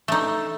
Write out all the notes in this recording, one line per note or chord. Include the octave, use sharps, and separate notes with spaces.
A3 D#4